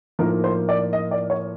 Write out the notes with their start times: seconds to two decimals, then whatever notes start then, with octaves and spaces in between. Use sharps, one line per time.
0.19 A2 F3 A#3 D#4 A#4
0.44 C5
0.69 D5
0.93 D#5
1.11 D5
1.30 C#5